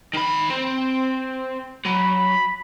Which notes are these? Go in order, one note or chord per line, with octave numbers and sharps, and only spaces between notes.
D#3 B5
C4
F#3 B5